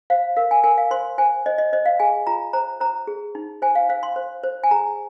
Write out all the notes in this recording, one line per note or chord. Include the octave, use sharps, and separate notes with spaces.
C5 F5
A#4 F5
G#5
A#4 G#5
F5
C5 C6
C5 G#5
C5 D#5
D#5
C5 D#5
F5
G#4 G#5
F4 A#5
C5 A#5
C5 A#5
G#4
D#4
C5 G#5
F5
C5 F5
C6
C5
C5
G#5
G#4 A#5